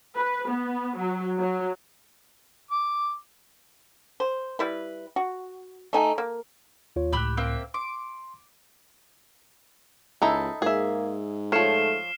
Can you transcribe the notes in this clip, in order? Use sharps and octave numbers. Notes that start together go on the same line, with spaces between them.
B4
B3
F#3
F#3
D6
C5
G3 E4 B4
F#4
A3 D#4 G#5
A#3
D#2 F4 C#5
C#2 A2 G4 B5 E6 F#6
A#3 C4 E5
C6 D6
C#2 D#4 E4 A4
G#2 A#3 G#4 E5
F3 A3 C#5 F6 C7 E7